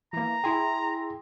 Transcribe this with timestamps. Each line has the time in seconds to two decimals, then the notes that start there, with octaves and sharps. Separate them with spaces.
0.13 E3 A#3 A#5
0.44 E4 G#4 G5 C6